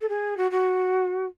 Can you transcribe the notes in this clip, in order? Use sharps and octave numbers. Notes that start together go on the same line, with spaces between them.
A4
G#4
F#4
F#4